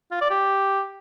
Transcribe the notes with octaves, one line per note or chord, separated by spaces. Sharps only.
F4
D5
G4